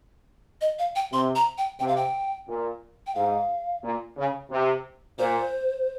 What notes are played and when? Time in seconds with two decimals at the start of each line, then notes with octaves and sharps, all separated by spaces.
0.61 D#5
0.79 F5
0.96 G5
1.12 C3 C6
1.35 A#5
1.58 G5
1.80 C3 G5
1.88 F5
1.97 G5
2.48 A#2
3.07 G5
3.15 G#2 F5
3.84 A#2
4.18 C#3
4.51 C3
5.19 A#2 C5